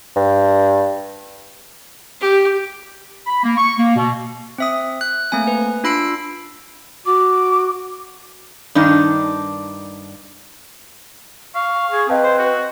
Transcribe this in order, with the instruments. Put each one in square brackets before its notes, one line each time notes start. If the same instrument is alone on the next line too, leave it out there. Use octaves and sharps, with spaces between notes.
[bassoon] G2
[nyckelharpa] G4
[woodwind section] B5
A#3
C#6
A#3
B2
[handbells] C4 E5 D#6
F#6
A3 A#3 C4 G#5
B4
D4 F4 B5 E6 C7 D7
[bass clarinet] F#4 [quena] D6
[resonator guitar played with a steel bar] G2 D#3 D4 D#4
[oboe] F5 [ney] C#6
[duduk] G#4 [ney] C#6
[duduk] C4 [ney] B4 [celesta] D#5 F5 A5
[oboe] C5
F#4